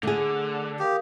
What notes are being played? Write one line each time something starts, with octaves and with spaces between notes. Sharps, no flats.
D3 A3 G#4 D6
G4 A#4 F5 D#6